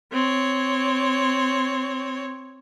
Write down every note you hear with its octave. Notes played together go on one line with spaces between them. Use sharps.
C4 C#5